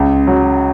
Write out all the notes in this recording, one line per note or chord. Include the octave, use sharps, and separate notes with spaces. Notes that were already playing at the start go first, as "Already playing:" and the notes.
Already playing: C#2
F#3